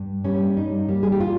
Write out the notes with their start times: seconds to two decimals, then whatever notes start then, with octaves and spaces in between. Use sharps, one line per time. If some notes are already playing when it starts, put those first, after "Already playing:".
Already playing: G2
0.25 G3 A#3 C#4
0.57 G2 D#4
0.89 G3 A#3
1.03 G#4
1.12 G4
1.20 F4